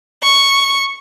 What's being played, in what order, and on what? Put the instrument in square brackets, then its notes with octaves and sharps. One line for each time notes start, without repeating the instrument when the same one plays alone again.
[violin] C#6